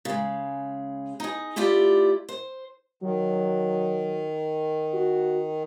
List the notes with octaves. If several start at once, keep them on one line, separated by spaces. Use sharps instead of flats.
C#3 G#3
D#4 G#4
A3 E4 F4 G4 D5
C5
D#3 F#3
F#4